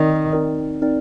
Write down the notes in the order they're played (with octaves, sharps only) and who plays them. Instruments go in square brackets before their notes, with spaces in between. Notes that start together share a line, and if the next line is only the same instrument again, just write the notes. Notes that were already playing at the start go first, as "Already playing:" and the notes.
Already playing: [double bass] D#3 [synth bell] C4 D#4 A#4 D5
[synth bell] C4 D#4 A#4 D5
C4 D#4 A#4 D5